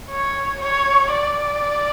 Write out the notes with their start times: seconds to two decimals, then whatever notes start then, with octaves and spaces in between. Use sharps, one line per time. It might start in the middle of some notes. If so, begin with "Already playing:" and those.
0.10 C#5
0.61 C#5
1.12 D5